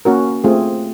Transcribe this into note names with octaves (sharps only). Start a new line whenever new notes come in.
A#3 C#4 F#4 A#4
A3 C4 F4 G#4